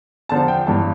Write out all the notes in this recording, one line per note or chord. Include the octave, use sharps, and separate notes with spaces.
E2 D3 F3 A5
G5
G1 G2 E3 A5